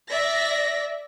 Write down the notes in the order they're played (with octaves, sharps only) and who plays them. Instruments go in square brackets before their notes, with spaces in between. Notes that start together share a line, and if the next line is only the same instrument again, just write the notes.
[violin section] D5 E5 A#6 B6